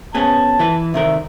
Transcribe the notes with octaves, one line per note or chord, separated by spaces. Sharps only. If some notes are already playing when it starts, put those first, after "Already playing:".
B3 C#4 G#4 A5
E3 E4 B4
C3 D#3 A#4 E5